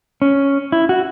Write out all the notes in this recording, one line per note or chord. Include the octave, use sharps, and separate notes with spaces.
C#4
E4
F#4